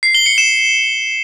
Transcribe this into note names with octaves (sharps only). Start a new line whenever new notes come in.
C7
G7
C#7
E7